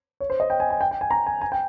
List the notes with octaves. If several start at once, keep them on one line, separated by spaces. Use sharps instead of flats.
C#5
C5
D#5
G5
G#5
G#5
G5
G5
G#5
A#5
G#5
G#5
G5